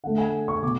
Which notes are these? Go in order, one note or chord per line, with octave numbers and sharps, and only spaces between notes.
D3 A3 F#5
G#5
C#6
B2 D6